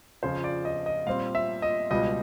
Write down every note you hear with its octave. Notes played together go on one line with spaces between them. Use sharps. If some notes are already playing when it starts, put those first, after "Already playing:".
F2 C#3 F3 C5
D5
D#5
D#5
A#2 G3 C4 F5
E5
D#5
C#2 B2 G3 D#5